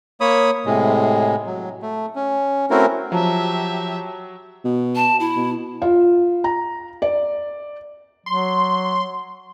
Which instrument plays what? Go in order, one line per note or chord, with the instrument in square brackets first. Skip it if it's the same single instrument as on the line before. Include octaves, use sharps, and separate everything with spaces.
[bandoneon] A#3 C#5 B5 D#6
A2 C3 G#3
F#3
A3
C#4
A3 C4 C#4 E4 F#4 A#4
[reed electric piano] F3 [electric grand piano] F#3 [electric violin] G4 E5 [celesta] A5 A#5
[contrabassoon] B2
[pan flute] A5
E4
[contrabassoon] B2
[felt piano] F4
A#5
D5
[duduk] F#3 [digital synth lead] C6